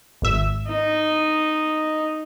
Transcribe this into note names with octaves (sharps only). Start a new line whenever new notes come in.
G#1 E5
D#4